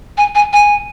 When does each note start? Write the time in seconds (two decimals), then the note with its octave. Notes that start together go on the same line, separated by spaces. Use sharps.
0.18 G#5
0.35 G#5
0.53 G#5